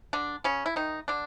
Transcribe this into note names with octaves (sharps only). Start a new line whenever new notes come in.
D3 D4
C#3 C#4
E4
D#3 D#4
D3 D4